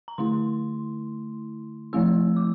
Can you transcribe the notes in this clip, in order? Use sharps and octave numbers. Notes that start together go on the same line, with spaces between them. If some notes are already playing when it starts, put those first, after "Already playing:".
A#5
D3 A3 E4 C6
F3 A3 C4 E4 E6
D6